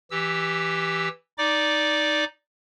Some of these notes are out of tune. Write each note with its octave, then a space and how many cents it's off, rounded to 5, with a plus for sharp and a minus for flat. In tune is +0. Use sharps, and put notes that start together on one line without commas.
E3 +0 G4 +0 E6 -10
D#4 +0 D5 -5 D6 +0